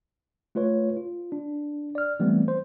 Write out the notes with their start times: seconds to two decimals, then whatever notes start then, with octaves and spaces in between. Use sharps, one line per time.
0.55 A3 F4 B4 C#5
0.97 F4
1.32 D4
1.95 D5 F6
2.20 E3 G3 A3 B3 C4
2.48 C5